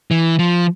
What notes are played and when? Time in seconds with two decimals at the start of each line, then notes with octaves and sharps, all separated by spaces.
0.11 E3
0.39 F3